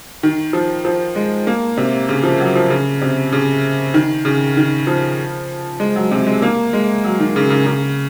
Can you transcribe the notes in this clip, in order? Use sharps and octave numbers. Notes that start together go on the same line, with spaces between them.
D#3
F3
F3
G#3
A#3
C3
C#3
F3
F#3
F3
C#3
C3
C#3
D#3
C#3
D#3
F3
G#3
F#3
C3
G#3
A#3
G#3
F#3
D#3
C#3
C#3
C#3